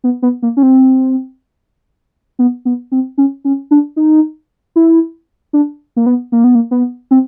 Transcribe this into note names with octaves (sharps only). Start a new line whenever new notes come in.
B3
B3
A#3
C#4
C4
B3
B3
C4
C#4
C#4
D4
D#4
E4
D4
A#3
B3
A#3
B3
A#3
B3
C4